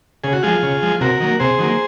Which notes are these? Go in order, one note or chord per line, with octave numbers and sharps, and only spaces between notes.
C#3 G#4
F#4
F3 G#3 F4 G#4
C#3
F3 G#3
C3 F#4 A#4
D#3 F#3 A#3
C3 G#4 C5
D#3 F#3 A#3